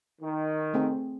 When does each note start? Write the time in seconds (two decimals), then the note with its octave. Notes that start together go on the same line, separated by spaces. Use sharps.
0.21 D#3
0.74 A3 C4 G#4